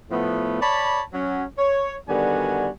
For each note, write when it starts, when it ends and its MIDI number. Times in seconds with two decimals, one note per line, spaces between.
0.10 0.61 45
0.10 0.61 53
0.10 0.61 57
0.10 0.61 59
0.61 1.01 73
0.61 1.01 74
0.61 1.01 81
0.61 1.01 83
1.13 1.43 54
1.13 1.43 61
1.58 1.95 73
2.08 2.68 50
2.08 2.68 51
2.08 2.68 55
2.08 2.68 59
2.08 2.68 66
2.08 2.68 80